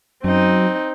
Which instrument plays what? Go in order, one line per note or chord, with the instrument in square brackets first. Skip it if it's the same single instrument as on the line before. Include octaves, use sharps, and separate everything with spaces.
[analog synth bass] F#2 [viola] C4 D#4